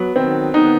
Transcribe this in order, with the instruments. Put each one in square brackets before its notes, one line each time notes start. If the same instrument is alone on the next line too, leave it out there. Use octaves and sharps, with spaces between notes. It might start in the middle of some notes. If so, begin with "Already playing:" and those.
Already playing: [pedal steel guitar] F#3 [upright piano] B3
[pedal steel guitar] D#3 [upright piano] C4
[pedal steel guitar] B3 [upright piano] D#4